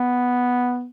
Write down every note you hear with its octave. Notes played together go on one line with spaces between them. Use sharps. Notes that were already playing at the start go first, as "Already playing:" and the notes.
Already playing: B3